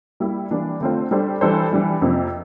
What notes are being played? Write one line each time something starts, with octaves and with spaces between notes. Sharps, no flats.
G3 A#3 E4
E3 G3 A#3 D4
D3 A3 C4 F4 C5
G3 D4 A4 C5
E3 G3 D4 A4 C5
E3 G3 D4
F2 C3 F3 A#3